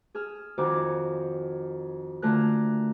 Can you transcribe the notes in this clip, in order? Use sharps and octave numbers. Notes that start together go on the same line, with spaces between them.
G#4 E6 F6
F2 D#3 F#4 G#5 D6
D3 A3 F4 A#4 G#5 F#6